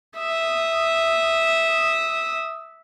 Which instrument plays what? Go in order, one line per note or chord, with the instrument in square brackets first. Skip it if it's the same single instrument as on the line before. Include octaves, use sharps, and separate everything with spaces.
[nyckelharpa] E5 D#6